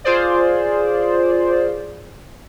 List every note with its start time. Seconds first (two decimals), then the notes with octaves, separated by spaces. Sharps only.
0.04 F4 G#4 C5 D5